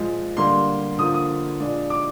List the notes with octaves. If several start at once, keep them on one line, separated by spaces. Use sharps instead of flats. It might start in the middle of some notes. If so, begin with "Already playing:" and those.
Already playing: A#2 F3 G#3
D3 G3 A#3 C6
D3 F3 A#3 D#6
D#6
A#2 G#3 D4
D6